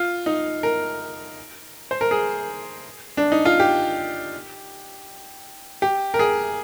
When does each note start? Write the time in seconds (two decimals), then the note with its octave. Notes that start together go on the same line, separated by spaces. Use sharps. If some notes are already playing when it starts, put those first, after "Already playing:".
Already playing: F4
0.26 D#4
0.63 A#4
1.91 C5
2.01 A#4
2.11 G#4
3.17 D4
3.32 D#4
3.45 F4
3.60 G4
5.82 G4
6.14 A#4
6.19 G#4